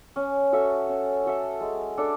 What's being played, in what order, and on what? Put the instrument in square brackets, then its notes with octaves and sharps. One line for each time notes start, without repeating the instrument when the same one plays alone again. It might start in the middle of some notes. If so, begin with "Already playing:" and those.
[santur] C#4
F#4 A4 E5
C#4
F#4 A4 E5
G#3
D4 A4 D5